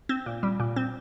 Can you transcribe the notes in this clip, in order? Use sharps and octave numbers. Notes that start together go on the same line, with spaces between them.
C4
A#2
G3
A#2
C4